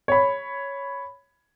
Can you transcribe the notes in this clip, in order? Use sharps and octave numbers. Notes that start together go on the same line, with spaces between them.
C#5 B5